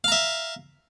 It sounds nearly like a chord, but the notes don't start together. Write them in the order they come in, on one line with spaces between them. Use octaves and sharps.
F5 A#5 E5